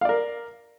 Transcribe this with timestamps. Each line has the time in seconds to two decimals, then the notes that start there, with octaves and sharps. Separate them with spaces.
0.01 F5
0.05 D5
0.09 A#4